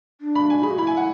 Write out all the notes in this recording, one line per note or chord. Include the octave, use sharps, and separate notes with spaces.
D4
B5
G#5
G#4 B5
F#4
E4 B5
G#5
F#5